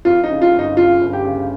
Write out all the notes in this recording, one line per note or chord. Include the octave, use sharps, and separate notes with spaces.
F2 F4
D#4
C#3
F4
G1
D#4
C#3 F4
G1
G4
C#3